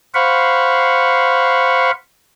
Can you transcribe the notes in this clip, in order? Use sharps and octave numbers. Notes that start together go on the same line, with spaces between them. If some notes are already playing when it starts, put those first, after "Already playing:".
C5 F5 F#5 B5 C#6